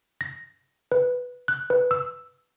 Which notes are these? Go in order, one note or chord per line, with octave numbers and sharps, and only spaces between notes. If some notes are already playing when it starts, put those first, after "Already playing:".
A#6
B4
F#6
B4
E6